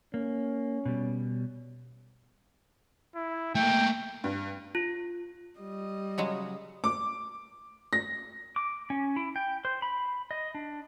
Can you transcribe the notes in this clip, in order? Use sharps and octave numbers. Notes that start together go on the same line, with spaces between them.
A#3 C#4
B2 G3
E4
A3 A#3 G5
G2
F4
G3 D#5
C#3 F#3 G#3
D6
A#6
D6
C#4
E4
G5
C5
B5
D#5
D4